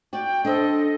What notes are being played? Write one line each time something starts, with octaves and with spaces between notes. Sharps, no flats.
F#4 D5 G5
D4 A4 C5 D#5